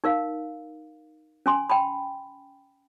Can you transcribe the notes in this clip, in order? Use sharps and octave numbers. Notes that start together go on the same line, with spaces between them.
D#4 A#4 F5
C#4 G#5 C6
G5 A5 B5